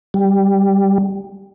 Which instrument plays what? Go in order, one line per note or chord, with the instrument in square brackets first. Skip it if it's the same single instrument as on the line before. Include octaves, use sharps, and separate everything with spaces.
[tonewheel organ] G3